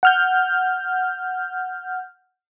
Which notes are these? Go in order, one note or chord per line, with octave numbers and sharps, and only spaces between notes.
F#5 F6 G6